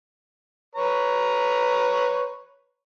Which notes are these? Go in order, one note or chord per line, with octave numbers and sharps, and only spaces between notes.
B4 C#5 A#5